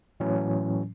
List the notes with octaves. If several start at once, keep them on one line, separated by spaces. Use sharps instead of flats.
A2 E3 F#3 C#4